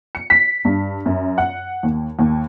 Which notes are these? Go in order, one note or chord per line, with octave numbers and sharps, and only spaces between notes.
C#7
B6
G2
F#2
F#5
D#2
D#2